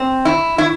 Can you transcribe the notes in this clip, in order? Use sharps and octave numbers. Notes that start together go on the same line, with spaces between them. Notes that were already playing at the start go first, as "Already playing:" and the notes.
Already playing: C4
E4
E4